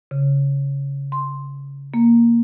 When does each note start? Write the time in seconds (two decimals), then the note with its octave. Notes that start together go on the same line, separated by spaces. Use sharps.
0.11 C#3
1.12 C6
1.94 A#3